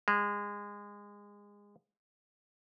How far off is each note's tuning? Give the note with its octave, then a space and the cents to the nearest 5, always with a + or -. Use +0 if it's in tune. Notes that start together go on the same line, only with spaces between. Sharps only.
G#3 -25